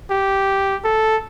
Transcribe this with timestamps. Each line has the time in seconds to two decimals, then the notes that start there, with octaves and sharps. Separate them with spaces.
0.11 G4
0.84 A4